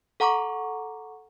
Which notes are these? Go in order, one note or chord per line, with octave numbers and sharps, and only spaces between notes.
A4 F#5 A#5 C#6 D6